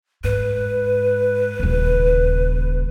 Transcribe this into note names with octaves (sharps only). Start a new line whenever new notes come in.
G#2 B4
D#1 C#3